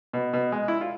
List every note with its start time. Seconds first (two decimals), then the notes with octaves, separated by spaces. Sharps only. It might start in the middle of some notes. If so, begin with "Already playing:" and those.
0.13 B2
0.33 B2
0.52 G#3
0.68 E4
0.81 F4